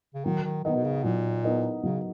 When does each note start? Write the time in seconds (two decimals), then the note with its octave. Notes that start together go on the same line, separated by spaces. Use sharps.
0.15 C#3
0.25 D#3 F#3
0.45 D#3
0.64 D#3 B3 D#4 A#4 D#5
0.75 B2
0.84 C#3
1.04 A#2 F#3
1.44 B3 D#4 A#4 D#5
1.83 C#3 F#3